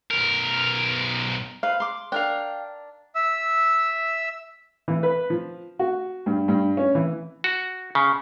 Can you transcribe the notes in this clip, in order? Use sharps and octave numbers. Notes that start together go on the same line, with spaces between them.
B1 A#4
B4 C5 F5
C6 D6
D4 A#4 F5 G5
E5 E6
E3
B4
F3
F#4
G2
G2
C#4
E3
F#4
C#3